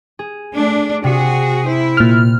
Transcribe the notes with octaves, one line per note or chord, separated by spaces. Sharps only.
G#4
A3 D4
C3 F#4 G#4
E4 C5
A#2 F6